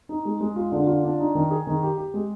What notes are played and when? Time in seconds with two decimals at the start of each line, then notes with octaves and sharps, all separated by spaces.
0.09 D#4
0.25 G#3
0.41 G#3
0.56 F4
0.72 D3
0.87 F4
1.04 D4
1.19 D#4
1.35 D#3
1.51 G#4
1.67 D#3
1.82 G4
1.98 G4
2.14 G#3